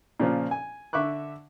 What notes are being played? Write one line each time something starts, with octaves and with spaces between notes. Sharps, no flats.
A#2 C#3 F3
G#5
D3 E5 C#6 D6 F#6